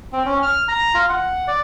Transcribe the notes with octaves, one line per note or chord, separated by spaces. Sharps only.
C4
C#4
F6
A#5
F4
F#5
D5